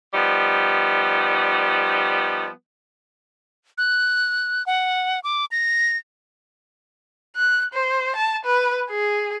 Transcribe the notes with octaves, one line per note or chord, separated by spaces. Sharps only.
F3 G3 B3 D#4
F#6
F#5
D6
A#6
F#6
C5
A5
B4
G#4